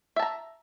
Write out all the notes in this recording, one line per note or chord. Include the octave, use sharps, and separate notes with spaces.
E5 A5 A#5